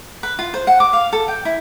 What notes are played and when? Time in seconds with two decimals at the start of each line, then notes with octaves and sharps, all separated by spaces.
0.23 B4
0.39 F4
0.54 C5
0.67 F#5
0.80 D6
0.93 F5
1.13 A4
1.28 G5
1.45 E4